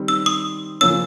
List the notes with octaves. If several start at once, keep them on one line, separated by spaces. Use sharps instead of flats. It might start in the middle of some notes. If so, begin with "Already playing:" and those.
Already playing: D#3 G3 C4
E6
D#6
C#3 F3 A#3 C#4 E6